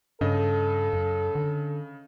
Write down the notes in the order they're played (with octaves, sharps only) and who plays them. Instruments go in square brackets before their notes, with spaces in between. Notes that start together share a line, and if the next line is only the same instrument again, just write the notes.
[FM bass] G2 [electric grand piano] C#3 D#5 [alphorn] A4
[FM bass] F#2
D3